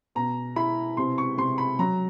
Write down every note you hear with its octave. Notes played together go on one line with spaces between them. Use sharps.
B2 A#5
E4 B5
C3 C6
C#6
C3 C6
B5
F#3 A#5